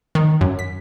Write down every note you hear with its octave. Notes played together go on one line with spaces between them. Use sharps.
D#3
F#2
B6